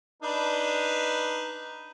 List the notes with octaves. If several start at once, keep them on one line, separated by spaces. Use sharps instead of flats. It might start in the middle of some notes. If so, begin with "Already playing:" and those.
D4 D#4 B4